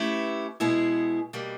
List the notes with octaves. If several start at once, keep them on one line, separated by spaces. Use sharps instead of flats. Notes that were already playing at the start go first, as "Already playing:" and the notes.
Already playing: A3 C#4 E4 G4 B4
B2 G#3 B3 E4 G#4
B2 G3 A#3